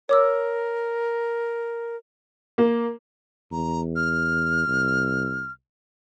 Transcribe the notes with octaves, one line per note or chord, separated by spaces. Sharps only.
A#4 C#5 D6 E6
A#3
E2 A#5
F6
C2